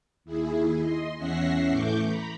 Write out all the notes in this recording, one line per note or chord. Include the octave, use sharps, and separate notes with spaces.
D#2 E4 G#4
D#5 C6
E2 C#4 E5 F#5 A#6 C7
A2 E3 A3 C#6 D6 G6
A#5 B5